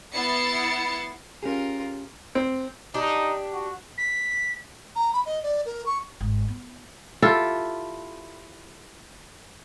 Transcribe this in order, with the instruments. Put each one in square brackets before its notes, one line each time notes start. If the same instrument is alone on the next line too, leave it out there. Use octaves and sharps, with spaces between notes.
[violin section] B3 E4 A6 C7 C#7
[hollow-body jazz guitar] C#4 G4 G#4 [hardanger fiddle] F4 A#4
[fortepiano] C4
[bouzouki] D4 G4 [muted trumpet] D#4
[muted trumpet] F#4
[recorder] B6
[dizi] A#5
B5
D#5
D5
A#4
C#6
[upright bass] G#1
B3
[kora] E4 F4 G4 A4